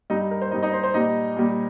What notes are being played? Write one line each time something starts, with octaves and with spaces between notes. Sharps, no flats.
G2 G3 D#4 D#5
A#4
C5
G2 G3 D#4 D#5
D#4 D#5
C5
C5
A#2 G3 D#4 D#5
A#2 G3